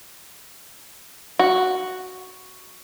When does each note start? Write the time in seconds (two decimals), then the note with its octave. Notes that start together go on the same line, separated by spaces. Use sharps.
1.39 F#4